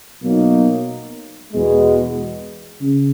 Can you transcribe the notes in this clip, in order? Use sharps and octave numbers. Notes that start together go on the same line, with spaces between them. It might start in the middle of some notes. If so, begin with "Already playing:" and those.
B2 F#3 A#3 D#4
E2 B2 G#3
C#3